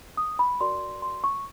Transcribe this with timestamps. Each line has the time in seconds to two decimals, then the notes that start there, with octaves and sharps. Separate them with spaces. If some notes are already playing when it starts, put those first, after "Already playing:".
0.17 D#6
0.39 B5
0.61 F#4 A#4 D5 C6
1.02 C6
1.24 C#6